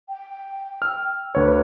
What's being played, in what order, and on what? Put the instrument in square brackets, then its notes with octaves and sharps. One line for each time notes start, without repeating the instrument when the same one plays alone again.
[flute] G5
[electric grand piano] E6 F6
[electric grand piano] D2 C#5 [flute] B4